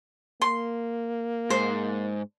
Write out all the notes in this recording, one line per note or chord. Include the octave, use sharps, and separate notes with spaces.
A#3 C6
G#2 C5